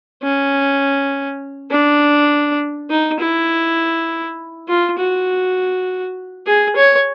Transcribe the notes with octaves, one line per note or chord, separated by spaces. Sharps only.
C#4
D4
D#4
E4
F4
F#4
G#4
C#5